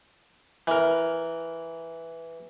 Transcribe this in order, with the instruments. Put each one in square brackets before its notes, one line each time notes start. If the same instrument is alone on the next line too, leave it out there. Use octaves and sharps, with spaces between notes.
[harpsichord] E3 A#4